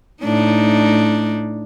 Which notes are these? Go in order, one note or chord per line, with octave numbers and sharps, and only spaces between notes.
A2 D4 D#4